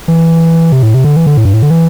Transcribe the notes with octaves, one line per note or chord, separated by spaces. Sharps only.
E3
C3
A2
C3
D3
E3
D3
A2
G2
A2
D3
E3